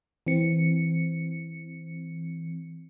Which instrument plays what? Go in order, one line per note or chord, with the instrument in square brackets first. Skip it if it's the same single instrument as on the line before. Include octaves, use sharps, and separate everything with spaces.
[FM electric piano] E3 C4 C#7